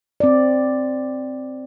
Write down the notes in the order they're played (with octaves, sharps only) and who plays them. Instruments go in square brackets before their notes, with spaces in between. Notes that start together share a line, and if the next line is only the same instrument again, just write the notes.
[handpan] C4 D5